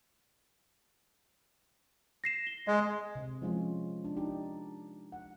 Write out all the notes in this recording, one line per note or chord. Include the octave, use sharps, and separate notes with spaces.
A#6 C7 E7
G7
G#3 D#5
C3
F3 G#3 C#4 F4
D4
D4 D#4 G4
F#5